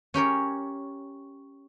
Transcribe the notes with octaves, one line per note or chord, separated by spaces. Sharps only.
C#4 G4 A#4 C#5